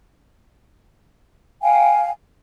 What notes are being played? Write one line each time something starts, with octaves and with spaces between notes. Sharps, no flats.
F5 G5 G#5